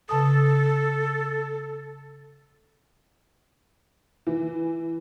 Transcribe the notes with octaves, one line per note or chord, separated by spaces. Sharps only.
C#3 A4 A5 D#6
E3